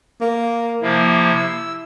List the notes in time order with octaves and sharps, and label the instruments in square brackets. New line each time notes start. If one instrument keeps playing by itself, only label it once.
[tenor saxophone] A#3
[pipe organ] C3 F3 A#3 [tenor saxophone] E4
[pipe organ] E6